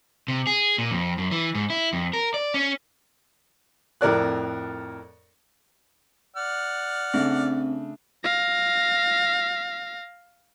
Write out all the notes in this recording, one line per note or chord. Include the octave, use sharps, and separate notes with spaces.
C3
G#4
A#2
F2
F#2
E3
G#2
E4
F2
A#4
D5
C#4
F2 A2 A#4 D5 F#6
D5 F#5 F6
C#3 A3 C4 D4
F5 A#6